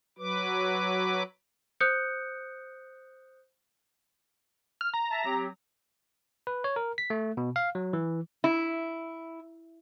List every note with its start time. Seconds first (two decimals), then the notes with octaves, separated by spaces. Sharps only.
0.18 F#3 B4 D6
1.80 C5 D#6 F#6 G6 C#7
4.81 F6
4.94 A#5
5.11 E5 A5
5.25 F#3 C4 G4
6.47 B4
6.64 C#5
6.76 A#4
6.98 B6
7.10 A3
7.37 B2
7.56 F5
7.75 F#3
7.93 E3
8.44 E4